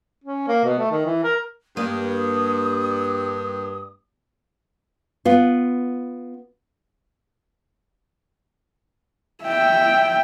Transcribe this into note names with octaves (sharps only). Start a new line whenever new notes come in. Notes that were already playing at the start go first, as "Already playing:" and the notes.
C#4
A#3
B2
A3
D#3
E3
A#4
G2 A#3 D#6
B3 F4
E5 G5